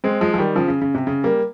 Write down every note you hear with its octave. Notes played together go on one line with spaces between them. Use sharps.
G#3 C4
F3 G#3
F3
D#3 G3
C#3 F3
C#3
C#3
C3
C#3
G3 A#3